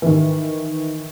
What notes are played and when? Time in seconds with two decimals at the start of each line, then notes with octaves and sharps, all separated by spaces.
0.02 D#3 E3